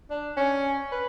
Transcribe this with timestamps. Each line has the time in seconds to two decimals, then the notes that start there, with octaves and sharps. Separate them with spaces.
0.10 D4
0.37 C#4
0.92 B4